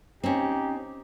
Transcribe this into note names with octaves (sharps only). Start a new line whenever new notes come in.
C4 C#4 D#4 G4